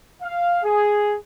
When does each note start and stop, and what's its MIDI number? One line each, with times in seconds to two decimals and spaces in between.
0.23 0.59 77
0.64 1.16 68